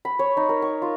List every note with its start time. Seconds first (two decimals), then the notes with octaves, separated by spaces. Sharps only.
0.05 B5
0.19 C#5
0.37 D#4
0.49 A#4
0.62 C#6
0.82 F4